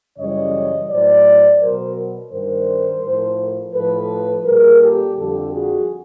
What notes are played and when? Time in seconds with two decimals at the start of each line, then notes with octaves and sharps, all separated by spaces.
0.18 F#2 C#3 E3 G3 C#5 D#5
0.90 A2 F#3 C5 D5
1.60 B2 F#3 A#4 C5
2.32 G2 D#3 G3 A#4 C5
3.03 A2 F3
3.74 A2 F3 A4 B4
4.46 A#2 G3 G#4 A#4
4.81 G4 A4
5.16 F2 D3 G3 G4 A4
5.53 F#4 G#4